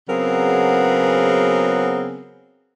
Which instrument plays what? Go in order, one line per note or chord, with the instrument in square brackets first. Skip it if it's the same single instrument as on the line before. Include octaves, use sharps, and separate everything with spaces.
[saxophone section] C#3 F#3 B3 C4 G#4 A#4